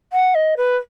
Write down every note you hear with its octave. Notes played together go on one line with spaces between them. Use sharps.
F#5
D#5
B4